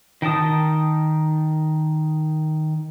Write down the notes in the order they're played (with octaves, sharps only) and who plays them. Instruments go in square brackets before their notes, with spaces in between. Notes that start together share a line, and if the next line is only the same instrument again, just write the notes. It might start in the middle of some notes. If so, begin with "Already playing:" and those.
[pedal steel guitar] D#3 G5 A5 D#6